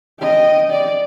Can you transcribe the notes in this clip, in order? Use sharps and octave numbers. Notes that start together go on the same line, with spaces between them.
D#5 G5
D5